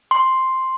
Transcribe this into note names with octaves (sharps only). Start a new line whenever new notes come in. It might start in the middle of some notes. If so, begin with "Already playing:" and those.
C6